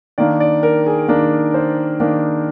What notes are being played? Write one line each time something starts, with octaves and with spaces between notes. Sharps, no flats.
D#3 A#3 D4 D5
D5
A#4
G#4
D#3 A#3 D4 A#4
C5
D#3 A#3 D4 A#4